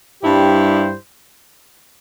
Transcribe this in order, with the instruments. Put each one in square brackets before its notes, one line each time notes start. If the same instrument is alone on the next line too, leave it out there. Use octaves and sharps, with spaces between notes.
[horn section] G2 G3 E4 G4 C5